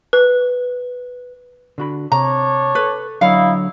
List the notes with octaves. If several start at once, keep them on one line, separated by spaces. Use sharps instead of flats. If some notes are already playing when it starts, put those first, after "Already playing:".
B4
D3 F#4 B5
C3 D4 C#5 A#5
A4 B4
D3 F#3 D#4 E4 C#5 F5